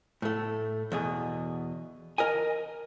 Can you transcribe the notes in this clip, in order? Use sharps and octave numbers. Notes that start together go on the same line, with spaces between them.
A2 A3
E2 B2 G#4
A#4 D#5 G#5